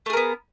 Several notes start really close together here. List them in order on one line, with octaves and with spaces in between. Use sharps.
A3 G#4 A#4 B3